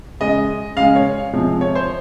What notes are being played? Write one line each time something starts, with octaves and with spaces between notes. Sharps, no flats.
C#3 G#3 D#5
C#3 G#3 F5
C#5
C3 F3 G#3
C#5
C5